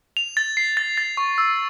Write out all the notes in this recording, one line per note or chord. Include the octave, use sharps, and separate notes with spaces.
F7
A6
C7
A6
A6
C#6
E6